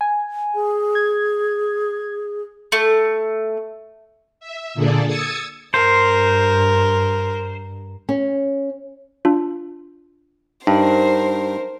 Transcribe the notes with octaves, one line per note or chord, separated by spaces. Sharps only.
G#5
G#4
G#6
A3
E5
A#2 D3 A#3 G#4 A4 D5
D#6 E6 G#6 A6 C#7
G2 A#4 C5
C#4
D4 F4
G2 D#4 A#4 C5